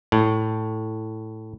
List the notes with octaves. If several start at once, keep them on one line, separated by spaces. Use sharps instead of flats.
A2